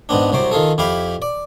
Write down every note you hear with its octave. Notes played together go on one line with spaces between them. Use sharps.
G#2 B3 C4 D4
C2 C3 F#3 C5 D6
D#3 F4 G#4 A4
F2 E4 G4 F5 G5 B5
D5